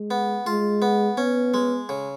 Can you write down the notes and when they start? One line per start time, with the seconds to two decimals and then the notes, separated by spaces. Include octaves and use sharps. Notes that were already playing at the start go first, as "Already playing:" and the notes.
Already playing: G#3
0.11 B3
0.46 G#3 F4
0.82 B3
1.17 B3 C#4
1.54 G#3
1.89 C#3